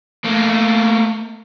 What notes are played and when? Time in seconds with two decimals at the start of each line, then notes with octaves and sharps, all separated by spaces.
0.24 A3 A#3